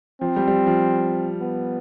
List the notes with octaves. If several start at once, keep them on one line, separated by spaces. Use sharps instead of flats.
F3 C4
G3
G3
F3
F3
B3